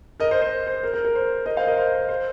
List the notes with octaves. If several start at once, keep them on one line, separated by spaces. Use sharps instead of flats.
A#4 D#5
C5
C5
C5
A#4
A#4
A#4
C5
A#4 D#5
C5 F5
A#4 D#5
C5
C5
C5